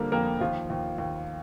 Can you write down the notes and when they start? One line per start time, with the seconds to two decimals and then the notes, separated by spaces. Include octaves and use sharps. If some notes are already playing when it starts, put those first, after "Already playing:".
Already playing: D3 F3 G3 A#3 A#4
0.12 F2 A#3 A#4
0.41 D#2 F3 F4
0.70 D#2
0.98 D#2